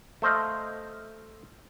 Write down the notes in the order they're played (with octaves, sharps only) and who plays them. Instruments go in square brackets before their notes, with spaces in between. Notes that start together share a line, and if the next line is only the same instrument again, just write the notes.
[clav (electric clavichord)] A3 C5 D#5 F5